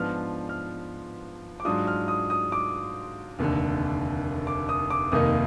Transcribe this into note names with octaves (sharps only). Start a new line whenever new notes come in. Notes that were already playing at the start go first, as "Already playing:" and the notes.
Already playing: G#2 F3 B3 D4 F4 F6
F6
D6
G#2 F#3 D4 F4 D#6
F6
D#6
D#6
D6
F1 D#2 D3
D6
D#6
D6
F1 D#2 D#3 A#3 D#4 D#6